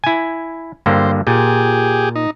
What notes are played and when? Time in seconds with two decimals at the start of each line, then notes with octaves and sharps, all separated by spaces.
0.04 E4 G#5
0.86 G2 D3 A#3 C5
1.27 A#2 G4 G#4
2.15 D#4